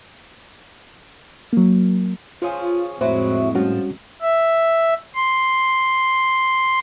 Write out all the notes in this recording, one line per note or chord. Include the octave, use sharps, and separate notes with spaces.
F#3 A#3
F3 C#4 F4 G#4
F2 A2 F#3 G#3 E4 F#4 C5
F3 G3 C#4 F#4
E5
C6